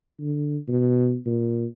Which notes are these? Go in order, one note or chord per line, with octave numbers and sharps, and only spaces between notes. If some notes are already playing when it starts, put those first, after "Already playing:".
D3
B2
A#2